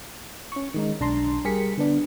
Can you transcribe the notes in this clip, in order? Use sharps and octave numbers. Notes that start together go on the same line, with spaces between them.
C#4 C#6
D#3 G#3 D#4
B1 D4 A5 A#5 C6
G3 G4 G#4 A#4 B6 C#7
D3 B3 D4